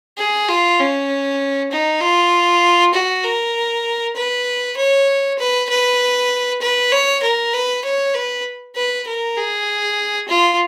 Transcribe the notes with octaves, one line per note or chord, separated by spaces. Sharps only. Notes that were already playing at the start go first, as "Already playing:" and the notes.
G#4
F4
C#4
D#4
F4
F#4
A#4
B4
C#5
B4
B4
B4
C#5
A#4
B4
C#5
B4
B4
A#4
G#4
F4